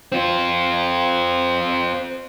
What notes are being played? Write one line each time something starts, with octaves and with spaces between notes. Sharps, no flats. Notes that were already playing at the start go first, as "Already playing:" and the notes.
C4 F4